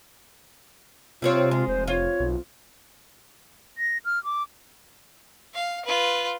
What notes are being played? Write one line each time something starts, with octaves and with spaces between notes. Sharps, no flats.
C3 G3 C4 F4 C#5
G#3
F1 C5
F4 C#5
B1
A#6
F6
D6
F5
F4 B4